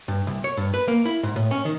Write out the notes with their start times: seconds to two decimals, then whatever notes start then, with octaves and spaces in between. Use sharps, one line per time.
0.08 G2
0.27 C2
0.44 C#5
0.57 G2
0.74 B4
0.88 A#3
1.05 E4
1.23 G#2
1.36 A2
1.51 C#4
1.65 D#3